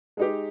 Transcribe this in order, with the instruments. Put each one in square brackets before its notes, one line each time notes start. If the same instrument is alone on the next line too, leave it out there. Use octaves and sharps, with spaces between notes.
[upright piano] G#3 D#4 G4